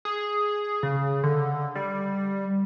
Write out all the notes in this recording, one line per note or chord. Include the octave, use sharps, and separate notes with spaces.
G#4
C#3
D3
G3